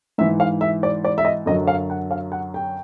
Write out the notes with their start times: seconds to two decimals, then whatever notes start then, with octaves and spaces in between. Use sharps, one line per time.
0.18 G#2 E5
0.21 E3
0.40 F5
0.61 E5
0.83 D5
1.04 D5
1.18 E5
1.25 D#5
1.46 F#2 D3 F#3 D#5
1.67 F5
1.90 F#5
2.11 F5
2.32 F#5
2.54 G5